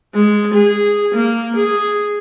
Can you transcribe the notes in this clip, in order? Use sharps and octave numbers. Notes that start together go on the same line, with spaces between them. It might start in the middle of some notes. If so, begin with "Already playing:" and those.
G#3
G#4
A#3
G#4